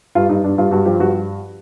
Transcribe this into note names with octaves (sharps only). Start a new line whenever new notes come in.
G2 F4
G2 D#4
G2 D4
G2 F4
G2 F#4
F3 G4
G2 F#4